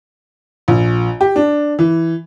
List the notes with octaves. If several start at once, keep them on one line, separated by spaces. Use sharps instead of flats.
A#1
G4
D4
E3